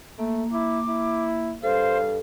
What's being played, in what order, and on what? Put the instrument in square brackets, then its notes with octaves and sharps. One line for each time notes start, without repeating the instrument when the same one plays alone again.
[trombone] A3 [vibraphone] A#3
[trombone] E4 [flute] D6
[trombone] E4
[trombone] G2 [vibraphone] A4 [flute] C5 [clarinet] F5